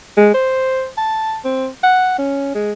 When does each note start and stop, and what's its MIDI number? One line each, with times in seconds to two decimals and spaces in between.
0.17 0.32 56
0.34 0.88 72
0.97 1.38 81
1.44 1.68 60
1.83 2.14 78
2.19 2.52 61
2.55 2.72 56